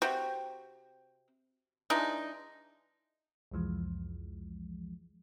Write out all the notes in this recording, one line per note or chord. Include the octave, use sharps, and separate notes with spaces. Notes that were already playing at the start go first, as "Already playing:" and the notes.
C3 C4 F#4 G4
E3 G#3 D4 D#4
C2 F2 E3 F3 G#3